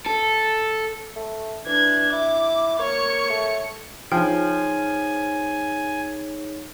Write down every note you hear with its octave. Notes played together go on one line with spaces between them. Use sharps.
A4
A3
E3 D4 G#6
E4 D6
A#3 C#5 C#7
A3
F3 D#4 G#4 C#5 G5 G#5